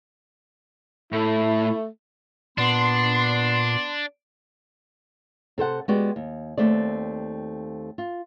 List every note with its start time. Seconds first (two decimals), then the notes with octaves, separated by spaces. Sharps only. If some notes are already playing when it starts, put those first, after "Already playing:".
1.12 A2 A3 E4
2.58 A#2 B3 D4 C6
5.58 C3 A4 C5 F#5
5.88 G#3 B3 F#4 G4 D5
6.16 D#2
6.58 D#2 A3 C4 D5
7.98 F4